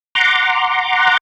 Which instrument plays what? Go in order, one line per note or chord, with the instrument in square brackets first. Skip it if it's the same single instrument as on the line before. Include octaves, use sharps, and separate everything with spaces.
[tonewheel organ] F#5 A#5 C6 D6